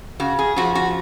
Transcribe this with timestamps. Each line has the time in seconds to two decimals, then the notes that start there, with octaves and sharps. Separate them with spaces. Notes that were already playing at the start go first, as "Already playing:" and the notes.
0.20 C#3 F#4
0.39 G#4
0.56 F3 F#4
0.75 F#4